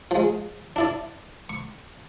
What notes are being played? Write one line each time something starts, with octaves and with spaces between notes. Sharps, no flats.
F3 G#3
D4 E4 D5
C#6